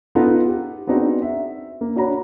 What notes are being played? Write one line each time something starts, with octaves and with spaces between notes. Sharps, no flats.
B3 D#4 F4 A4
G4
B3 C4 D4 D#4 F#4 G#4
E5
A#3
D4 F#4 C#5 A#5 B5